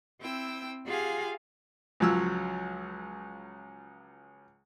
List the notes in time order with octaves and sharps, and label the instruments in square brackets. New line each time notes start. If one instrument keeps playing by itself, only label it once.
[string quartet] C4 E4 G5 E6
F4 G4 G#4 F5 F#5 G#5
[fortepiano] C#2 F3 F#3 E6